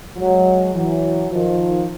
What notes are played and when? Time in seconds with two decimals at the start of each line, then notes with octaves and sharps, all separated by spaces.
0.17 F#3 G#3
0.74 E3 F#3
1.31 D#3 F3